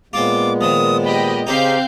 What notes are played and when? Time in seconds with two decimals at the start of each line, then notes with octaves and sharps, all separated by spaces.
0.13 A#2 G#3 B3 C4 F4 D6
0.61 D#3 F3 D#6
1.05 G4 D#5 G5 B5
1.47 C#3 C4 C#4 D#4 G4 F5 G6